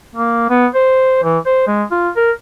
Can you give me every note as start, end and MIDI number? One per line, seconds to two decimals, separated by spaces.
0.15 0.47 58
0.50 0.67 59
0.74 1.20 72
1.23 1.38 52
1.46 1.64 72
1.67 1.84 56
1.91 2.09 65
2.16 2.31 70